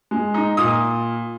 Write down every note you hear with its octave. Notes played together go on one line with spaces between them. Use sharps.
G#3
D#4
A#2 D#6